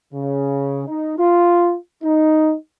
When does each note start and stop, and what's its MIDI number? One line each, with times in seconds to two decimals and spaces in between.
0.14 0.84 49
0.88 1.16 63
1.19 1.76 65
2.04 2.54 63